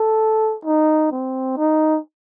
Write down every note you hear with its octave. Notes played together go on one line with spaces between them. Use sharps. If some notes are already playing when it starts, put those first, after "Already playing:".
Already playing: A4
D#4
C4
D#4